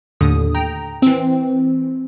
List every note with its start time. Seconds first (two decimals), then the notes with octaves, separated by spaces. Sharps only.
0.21 D#2 A2 D3 D#6
0.55 G5 A#5
1.02 E3 C4